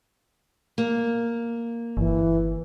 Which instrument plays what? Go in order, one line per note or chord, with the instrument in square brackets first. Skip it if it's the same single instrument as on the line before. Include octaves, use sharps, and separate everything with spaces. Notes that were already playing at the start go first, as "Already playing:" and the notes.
[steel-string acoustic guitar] A#3
[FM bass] G1 [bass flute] E3